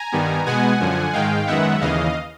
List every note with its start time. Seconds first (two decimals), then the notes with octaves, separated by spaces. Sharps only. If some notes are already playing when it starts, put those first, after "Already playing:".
Already playing: G#5 A#5
0.12 G2 D#3 G3 B3
0.46 B2 G#3 B3 F#5 G#5
0.80 F#2 D3 F3
1.13 G#2 D#3 G#3 F5 G5
1.47 F#2 D#3 G#3 B3 E5 F#5
1.81 D#2 C#3 E3 D#5 F5